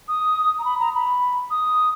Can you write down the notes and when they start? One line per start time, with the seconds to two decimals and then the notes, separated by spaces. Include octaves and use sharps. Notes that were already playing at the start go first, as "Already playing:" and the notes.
0.08 D#6
0.59 A#5
0.65 B5
0.80 A#5
0.94 B5
1.51 D#6